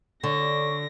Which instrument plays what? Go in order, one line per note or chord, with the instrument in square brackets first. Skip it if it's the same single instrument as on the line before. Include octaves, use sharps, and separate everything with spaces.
[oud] D3 [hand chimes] A4 C#5 D5 [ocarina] C#6 [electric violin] A#6